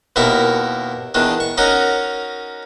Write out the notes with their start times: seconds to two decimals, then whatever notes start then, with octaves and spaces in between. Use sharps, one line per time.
0.16 D#2 B2 E4 A#4 C#6
1.14 E2 D#3 D4
1.40 C#6
1.58 C#4 D#4 F#4 A#4 A#5